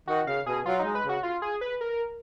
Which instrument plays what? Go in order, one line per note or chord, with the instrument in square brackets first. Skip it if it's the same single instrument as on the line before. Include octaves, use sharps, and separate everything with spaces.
[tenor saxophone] D#3 [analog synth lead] F#4
[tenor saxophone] C#3 [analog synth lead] F5
[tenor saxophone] B2 [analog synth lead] G#4
[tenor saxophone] F#3 [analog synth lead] F4
[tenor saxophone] G#3 [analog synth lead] D#4
[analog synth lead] B4
[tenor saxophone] C#3 [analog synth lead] F#4
[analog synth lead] F4
G#4
B4
A#4